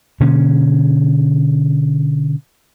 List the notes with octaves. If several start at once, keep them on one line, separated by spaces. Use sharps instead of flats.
B2 D3 A#3 C#4